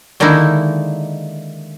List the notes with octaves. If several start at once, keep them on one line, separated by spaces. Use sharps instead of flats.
D3 D#3 G#3 A#3 D#4 E4